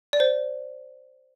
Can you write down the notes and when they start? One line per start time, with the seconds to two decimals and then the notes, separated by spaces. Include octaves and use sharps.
0.13 D5
0.20 C5